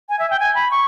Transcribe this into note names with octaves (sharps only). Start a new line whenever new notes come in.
G#5
E5
G5
G#5
B5
C#6